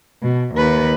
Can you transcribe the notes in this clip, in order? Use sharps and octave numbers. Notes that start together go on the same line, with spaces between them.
B2
D#2 B4